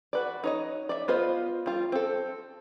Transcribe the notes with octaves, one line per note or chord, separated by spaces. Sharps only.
F#4 B4 D5
D#4 C#5 D#5
D5 E5
B3 F4 B4 C5 D#5
G3 F4
C4 A4